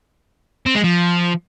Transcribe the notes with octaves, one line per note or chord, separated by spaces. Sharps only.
C4
G#3
F3